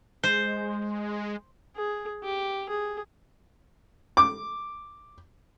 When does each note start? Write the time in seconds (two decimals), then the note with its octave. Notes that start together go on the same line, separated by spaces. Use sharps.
0.23 G#3 C5
1.76 G#4
2.24 G4
2.69 G#4
4.17 D6